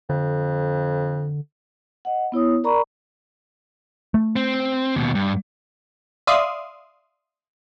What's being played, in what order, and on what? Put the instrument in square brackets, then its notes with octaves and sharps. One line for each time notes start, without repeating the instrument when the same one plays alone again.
[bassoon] F2 [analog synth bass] D3
[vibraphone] D#5 F#5
B3 E4 C#5 D#6
A#4 D5 A#5 B5 C#6
[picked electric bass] A3
[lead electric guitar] C4
D#2 B2
G2
[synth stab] D5 E5 F5 C6 D#6